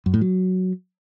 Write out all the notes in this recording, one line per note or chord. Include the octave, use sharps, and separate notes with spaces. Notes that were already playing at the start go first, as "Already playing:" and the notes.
F#2
A2
F#3